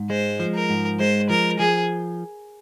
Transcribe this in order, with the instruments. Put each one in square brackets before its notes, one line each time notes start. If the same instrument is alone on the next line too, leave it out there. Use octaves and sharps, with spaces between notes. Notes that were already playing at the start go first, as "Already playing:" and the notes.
Already playing: [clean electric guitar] G#2
[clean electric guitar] G#3 [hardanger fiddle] C5
[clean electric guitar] F3
[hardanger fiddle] A#4
[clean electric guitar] G#2
[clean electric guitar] G#3 [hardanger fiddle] C5
[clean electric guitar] F3 [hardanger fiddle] A#4
[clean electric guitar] F3 [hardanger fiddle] G#4